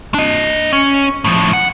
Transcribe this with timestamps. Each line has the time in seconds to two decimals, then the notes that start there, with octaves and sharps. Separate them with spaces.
0.14 D4 D#5
0.73 C#4
1.25 A2 F3
1.53 F#5